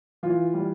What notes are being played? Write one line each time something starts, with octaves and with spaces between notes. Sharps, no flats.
E3 F4
G3